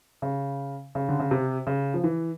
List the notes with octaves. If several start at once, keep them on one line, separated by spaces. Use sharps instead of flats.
C#3
C#3
D3
C#3
C3
C#3
F3
E3